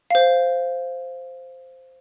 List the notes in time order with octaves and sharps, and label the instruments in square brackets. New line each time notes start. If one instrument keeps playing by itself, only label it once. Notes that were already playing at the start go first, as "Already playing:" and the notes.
[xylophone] C5 F5